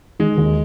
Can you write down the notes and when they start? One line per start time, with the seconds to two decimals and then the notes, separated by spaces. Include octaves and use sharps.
0.19 D#3 G#3
0.38 D#2